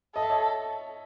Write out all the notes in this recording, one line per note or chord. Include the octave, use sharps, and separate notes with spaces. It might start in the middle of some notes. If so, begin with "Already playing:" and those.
A4 D#5
E5
C#5 D#5